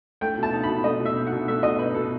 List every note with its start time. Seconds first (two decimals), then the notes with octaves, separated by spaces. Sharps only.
0.21 A3 G5
0.38 B2
0.43 A5
0.53 D#4
0.63 B5
0.69 B2
0.84 A3 D#5
1.00 B2
1.06 E5
1.16 D#4
1.27 F#5
1.32 B2
1.48 A3 E5
1.63 B2 D#5
1.79 D#4 B4
1.95 B2 A4